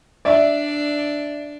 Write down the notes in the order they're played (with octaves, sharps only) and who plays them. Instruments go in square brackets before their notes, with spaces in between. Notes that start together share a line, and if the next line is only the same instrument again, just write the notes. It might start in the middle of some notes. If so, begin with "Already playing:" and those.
[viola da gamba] D4 [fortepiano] D5 E5